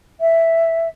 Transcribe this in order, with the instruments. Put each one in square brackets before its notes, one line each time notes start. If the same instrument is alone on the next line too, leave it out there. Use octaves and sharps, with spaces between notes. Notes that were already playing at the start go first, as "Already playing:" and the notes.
[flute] E5